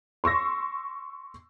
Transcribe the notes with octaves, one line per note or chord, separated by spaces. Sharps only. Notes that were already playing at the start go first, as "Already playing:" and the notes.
C6 C#6 E6 A#6